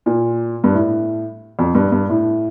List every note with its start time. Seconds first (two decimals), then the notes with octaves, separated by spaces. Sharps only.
0.06 A#2
0.64 G2
0.74 A2
1.59 F2
1.75 G2
1.92 G2
2.09 A2